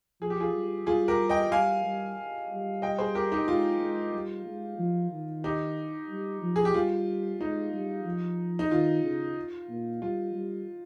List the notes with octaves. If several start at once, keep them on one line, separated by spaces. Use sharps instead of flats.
F3 G#4
G4
F4 G#4
G3
G3 F4 G#4
G4 A#4
D#5 G5
G3 F5 G#5
G3
G3
D#5 G5
G#4 C5
G4 A#4
D#4 G4
G#3 F4
G#3
G3
G#3
F3
D#3
D#4 G4
G3
F3
G#4
G4
G3 F4
G#3 D#4
G3
F3
D#4
D#3 F4
C#3
A#2
G3 F4
G3